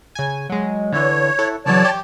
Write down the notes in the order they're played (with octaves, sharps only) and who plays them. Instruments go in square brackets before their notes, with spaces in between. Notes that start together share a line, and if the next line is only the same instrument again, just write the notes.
[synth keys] C#3 G#5
F#3 G#3
[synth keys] D3 E3 [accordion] C#5
[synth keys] E4 A4 F#5
[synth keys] C#3 E3 F#3 [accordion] C#5 D5 A5
[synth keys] G4